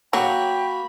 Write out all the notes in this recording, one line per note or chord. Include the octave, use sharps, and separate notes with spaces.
F#3 A#3 F#4 G5 B5